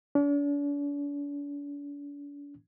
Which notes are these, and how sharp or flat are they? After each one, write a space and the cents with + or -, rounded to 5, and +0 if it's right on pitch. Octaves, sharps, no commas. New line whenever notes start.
D4 -40